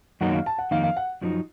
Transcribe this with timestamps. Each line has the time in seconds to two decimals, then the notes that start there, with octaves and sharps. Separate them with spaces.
0.21 F#2 D#3 F#3 A#3 D#4 F#5
0.34 F5
0.46 A5
0.58 F#5
0.71 F2 D#3 A#3 D#4 F5
0.83 F5
0.97 F#5
1.22 F#2 F3 A3 D#4 F#4